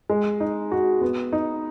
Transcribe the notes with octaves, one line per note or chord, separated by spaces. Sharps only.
G#3
D#4
F#4
B3
D#4